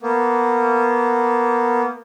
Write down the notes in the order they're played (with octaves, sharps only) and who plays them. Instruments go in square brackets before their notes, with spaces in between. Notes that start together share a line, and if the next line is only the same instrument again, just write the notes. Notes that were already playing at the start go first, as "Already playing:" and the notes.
[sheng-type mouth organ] A#3 B3